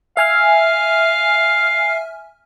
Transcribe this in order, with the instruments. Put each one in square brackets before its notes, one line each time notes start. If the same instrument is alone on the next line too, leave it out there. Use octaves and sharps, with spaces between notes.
[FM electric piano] E5 G#5 F6 [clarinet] F5